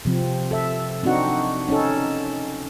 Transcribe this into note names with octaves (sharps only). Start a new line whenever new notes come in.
C3 F3 C4
A4 E5
C4 D4 D#4 F#4 F#5
C#4 D#4 A4